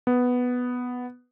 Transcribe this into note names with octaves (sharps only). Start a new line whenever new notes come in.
B3